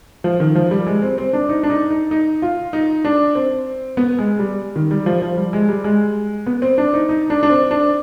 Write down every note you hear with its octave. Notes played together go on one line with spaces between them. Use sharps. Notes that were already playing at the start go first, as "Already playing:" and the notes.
F3
D#3
F3
G3
G#3
C4
C4
D4
D#4
D4
D#4
D#4
D#4
F4
D#4
D4
C4
B3
G#3
G3
D#3
G3
F3
F3
G3
G#3
G3
G#3
B3
C4
D4
D#4
D#4
D4
D4
C4
D4